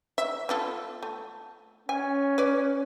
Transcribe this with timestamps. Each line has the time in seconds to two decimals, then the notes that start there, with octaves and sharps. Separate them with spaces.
0.18 E5
0.49 B3 F4 A4
1.03 A3
1.89 C#4 G#5
2.38 B4 D5